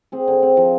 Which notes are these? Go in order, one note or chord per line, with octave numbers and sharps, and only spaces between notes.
C4 G#4
D3
C4
F3